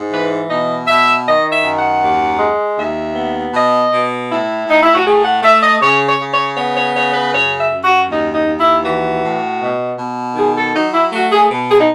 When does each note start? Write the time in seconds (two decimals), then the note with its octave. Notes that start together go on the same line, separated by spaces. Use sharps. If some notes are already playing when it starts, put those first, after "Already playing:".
Already playing: G#2
0.11 E3 B4
0.49 B2 D#5
0.87 B2 E5
1.25 D#3 D#5
1.50 E5
1.63 F#2
1.76 F#5
2.01 D#2
2.38 G#3
2.77 D#2 E5
3.15 B3
3.53 B2 D#5
3.91 B2
4.29 A2 E4
4.66 A2 D#4
4.83 E4
4.94 F#4
5.04 A3 G#4
5.23 F#5
5.42 A3 E5
5.61 D#5
5.80 C#3 C#5
6.06 C#5
6.18 C#3
6.31 C#5
6.56 B3 C#5
6.76 C#5
6.94 C#3 C#5
7.13 B4
7.32 F#2 C#5
7.57 E5
7.71 F#2
7.83 F#4
8.08 D#2 D#4
8.33 D#4
8.46 D#2
8.59 E4
8.84 E3 F#4
9.22 A2
9.60 B2
9.98 B2
10.35 D#3 G#4
10.55 A4
10.74 F#3 D#4
10.92 E4
11.11 A3 F#4
11.31 G#4
11.50 B2
11.68 G#4
11.79 D#4